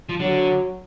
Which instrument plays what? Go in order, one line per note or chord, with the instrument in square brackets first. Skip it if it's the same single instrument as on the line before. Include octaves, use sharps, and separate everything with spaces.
[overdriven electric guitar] F3
[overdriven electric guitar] D3 [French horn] F#3